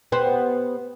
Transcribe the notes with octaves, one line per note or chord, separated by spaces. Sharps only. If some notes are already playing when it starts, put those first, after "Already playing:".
B3 G4 C5